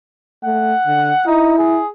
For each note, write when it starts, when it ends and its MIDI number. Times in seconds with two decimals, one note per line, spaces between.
0.44 0.73 57
0.44 1.25 78
0.86 1.12 50
1.26 1.54 63
1.26 1.80 64
1.58 1.87 68